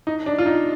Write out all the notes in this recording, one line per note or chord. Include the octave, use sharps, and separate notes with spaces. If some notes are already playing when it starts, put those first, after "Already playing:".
D#4
D4
F4
D#4